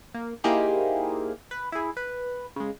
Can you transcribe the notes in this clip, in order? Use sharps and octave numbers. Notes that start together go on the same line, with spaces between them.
A#3
A#3 D#4 E4 G4 G#4 C5
B4
E4 G#4
B4
C#3 G#3